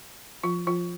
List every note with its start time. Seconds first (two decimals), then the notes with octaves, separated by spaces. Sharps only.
0.43 F3 F4
0.67 F3 F4